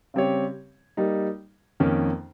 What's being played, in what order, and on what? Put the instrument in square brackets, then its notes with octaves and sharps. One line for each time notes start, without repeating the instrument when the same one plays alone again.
[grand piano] C#3 G3 C4 G4 C#5
G3 A#3 D#4
F2 D#3 A#3 C#4